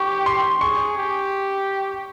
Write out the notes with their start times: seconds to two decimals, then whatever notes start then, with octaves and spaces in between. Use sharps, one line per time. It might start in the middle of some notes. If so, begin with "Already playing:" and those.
Already playing: G4 C#6
0.26 C6
0.61 G#4 C#6
0.98 G4